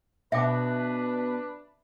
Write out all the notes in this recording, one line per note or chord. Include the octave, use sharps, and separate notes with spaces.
B2 D4 B4 E5 G5 D6